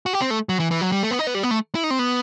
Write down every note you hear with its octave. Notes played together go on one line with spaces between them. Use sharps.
F#4
G4
C4
A3
F#3
E3
E3
F#3
G3
A3
B3
D#4
B3
G3
B3
A3
E4
D#4
C4
B3